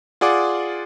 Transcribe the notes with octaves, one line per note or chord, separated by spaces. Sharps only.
F4 G#4 D5 F#5 D6